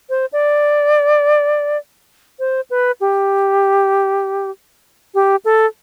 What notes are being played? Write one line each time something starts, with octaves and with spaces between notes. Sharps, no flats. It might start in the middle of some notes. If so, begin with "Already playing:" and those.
C5
D5
C5
B4
G4
G4
A4